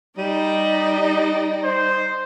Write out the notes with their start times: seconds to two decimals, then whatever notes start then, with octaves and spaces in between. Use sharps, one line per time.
0.18 G3 D#4 D5 D#5
1.64 C5